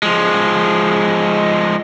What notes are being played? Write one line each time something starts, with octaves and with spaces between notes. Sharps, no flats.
F3 G#3